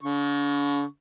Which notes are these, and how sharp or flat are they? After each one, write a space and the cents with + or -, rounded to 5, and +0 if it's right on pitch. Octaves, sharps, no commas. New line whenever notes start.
D3 -45 C#6 +0